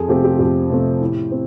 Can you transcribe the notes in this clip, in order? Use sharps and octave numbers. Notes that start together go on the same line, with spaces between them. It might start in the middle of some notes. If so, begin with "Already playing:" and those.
Already playing: F2 G#4 A4
C3 F3 A3 C4 G4
G4
F2 G4
C3 F3 A3 C4
A2
C4